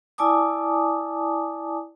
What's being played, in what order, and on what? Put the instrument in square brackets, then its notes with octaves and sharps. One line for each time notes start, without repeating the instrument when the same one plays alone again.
[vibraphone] E4 D5 G#5 A5 D6 D#6